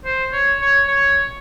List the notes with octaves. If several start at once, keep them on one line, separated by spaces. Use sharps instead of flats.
C5
C#5
C#5
C#5